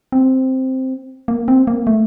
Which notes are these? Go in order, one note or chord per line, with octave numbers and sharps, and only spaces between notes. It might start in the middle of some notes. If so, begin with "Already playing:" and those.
C4
A#3
C4
A#3
A3